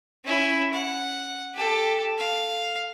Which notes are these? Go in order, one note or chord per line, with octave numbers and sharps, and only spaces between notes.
C#4 E4
F#5
G4 A4
F5